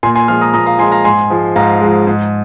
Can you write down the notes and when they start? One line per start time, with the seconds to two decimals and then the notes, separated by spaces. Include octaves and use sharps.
0.03 A#2 G#5 C6
0.15 G#5 C6
0.28 F3 G#3 C6 F6
0.41 A#5 D#6
0.54 A#2 A#5 D#6
0.66 F5 A#5
0.79 F3 G#3 G#5 C6
0.92 F5 A#5
1.04 G#2 G#5 C6
1.30 F3 G#3
1.56 G#2 F5 A#5
1.81 F3 G#3
2.07 G#2